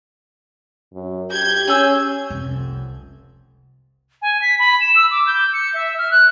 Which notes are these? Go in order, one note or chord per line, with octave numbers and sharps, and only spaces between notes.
F#2
G4 G6 G#6
C#4 G#4 G#5 E6
F1 C2
G#5
B6
B5
E7
E6
D6
G6
C#7
E5
F6
F#6